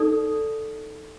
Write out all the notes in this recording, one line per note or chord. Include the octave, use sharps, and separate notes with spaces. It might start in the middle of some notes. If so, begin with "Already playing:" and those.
Already playing: D#4 A4 D5